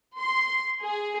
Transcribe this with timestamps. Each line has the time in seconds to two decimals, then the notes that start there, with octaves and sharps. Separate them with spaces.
0.19 C6
0.82 G#4